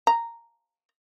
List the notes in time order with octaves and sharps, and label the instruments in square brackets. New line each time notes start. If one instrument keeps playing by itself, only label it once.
[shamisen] A#5